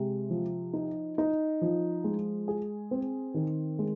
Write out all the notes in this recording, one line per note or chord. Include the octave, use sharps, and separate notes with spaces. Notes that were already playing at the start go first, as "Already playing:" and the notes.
Already playing: C3 G#3
F3
D#4
D#4
F3
G#3
G#4
C4
D#3
G#3